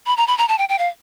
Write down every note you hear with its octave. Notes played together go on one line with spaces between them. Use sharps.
B5
A#5
B5
A#5
A5
G5
G5
F5